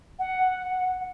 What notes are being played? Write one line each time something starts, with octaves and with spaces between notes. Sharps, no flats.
F#5